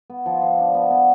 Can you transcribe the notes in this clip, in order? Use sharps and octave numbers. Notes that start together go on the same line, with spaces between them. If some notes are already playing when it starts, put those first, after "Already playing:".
B3
F3
F3
D4
B3
B3